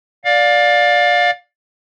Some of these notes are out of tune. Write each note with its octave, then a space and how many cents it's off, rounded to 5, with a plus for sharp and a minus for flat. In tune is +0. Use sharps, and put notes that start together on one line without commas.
D5 +0 F5 +25